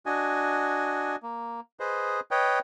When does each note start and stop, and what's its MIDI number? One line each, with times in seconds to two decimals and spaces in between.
0.06 1.16 62
0.06 1.16 66
0.06 1.16 75
0.06 1.16 80
1.23 1.60 58
1.80 2.20 68
1.80 2.20 71
1.80 2.20 72
1.80 2.20 75
2.31 2.59 71
2.31 2.59 73
2.31 2.59 75
2.31 2.59 79